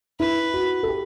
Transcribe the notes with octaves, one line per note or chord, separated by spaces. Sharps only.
E4 B4
F#4
A4
G4